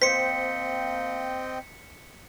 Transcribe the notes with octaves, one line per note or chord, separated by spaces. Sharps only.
A#3 C4 C5 D#5 G5 B6 C#7